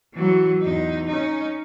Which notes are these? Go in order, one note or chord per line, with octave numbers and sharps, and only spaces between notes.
E3 F#3
E2 D#4
C#4 D#4